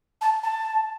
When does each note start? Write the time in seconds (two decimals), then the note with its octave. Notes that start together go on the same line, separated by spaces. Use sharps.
0.21 A5
0.43 A5